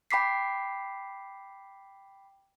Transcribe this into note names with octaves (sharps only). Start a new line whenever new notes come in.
G5 B5 D6 B6 C7